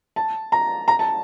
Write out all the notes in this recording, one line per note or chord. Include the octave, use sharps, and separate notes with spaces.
A5
A#5
A#5
A5